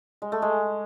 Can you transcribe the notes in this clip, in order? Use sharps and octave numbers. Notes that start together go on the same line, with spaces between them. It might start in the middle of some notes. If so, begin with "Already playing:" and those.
G#3
A3
G#3